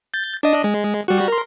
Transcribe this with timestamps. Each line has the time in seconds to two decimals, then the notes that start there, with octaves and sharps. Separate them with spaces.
0.14 G6 A6
0.43 D4 D#5
0.64 G#3
1.08 G3 F#4
1.28 A#4 C6